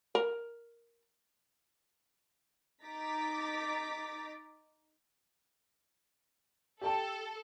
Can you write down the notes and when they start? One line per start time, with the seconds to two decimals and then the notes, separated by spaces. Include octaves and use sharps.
0.15 A#4
2.84 D#4 A#5 D6 A6 B6
6.81 G4 A4 G5 A5